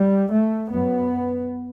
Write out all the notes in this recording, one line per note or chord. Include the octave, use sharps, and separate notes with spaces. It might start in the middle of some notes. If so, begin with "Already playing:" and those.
Already playing: G3
A3
F#2 B3